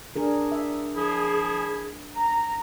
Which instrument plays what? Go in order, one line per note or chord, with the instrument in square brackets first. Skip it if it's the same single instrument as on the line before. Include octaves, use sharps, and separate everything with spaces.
[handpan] D4 G#4 A#4
E5
[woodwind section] F3 E4 G#4
A#5